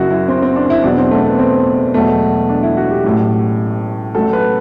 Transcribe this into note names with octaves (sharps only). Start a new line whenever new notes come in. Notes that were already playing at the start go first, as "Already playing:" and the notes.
Already playing: F#1 F#2 F#3 E4 F#4
E4
C4
C4
D4
E4
E2 B2 F#3 D4
C4
A3
C4
B3
C4
E1 E2 B2 F#3 A3
D4
E4
F#4
G4
A1 A2 F#3
A1 A2 F#3 A4
B4